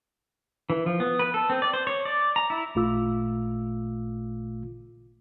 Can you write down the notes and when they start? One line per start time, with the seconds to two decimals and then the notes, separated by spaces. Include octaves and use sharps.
0.70 E3
0.86 F3
1.00 B3
1.19 B4
1.34 A4
1.50 C4
1.62 D5
1.74 C5
1.87 C#5
2.05 D5
2.36 A#5
2.50 E4
2.75 A1 A#2 A3 F4 D6 E6